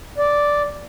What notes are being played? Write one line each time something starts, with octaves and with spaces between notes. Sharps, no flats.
D5